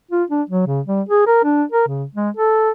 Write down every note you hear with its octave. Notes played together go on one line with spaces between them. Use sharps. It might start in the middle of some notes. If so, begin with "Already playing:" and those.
F4
D4
F#3
C#3
G3
G#4
A#4
D4
A#4
C#3
G#3
A4